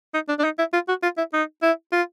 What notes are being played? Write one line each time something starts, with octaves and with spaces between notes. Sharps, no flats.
D#4
D4
D4
D#4
E4
F4
F#4
F4
E4
D#4
E4
F4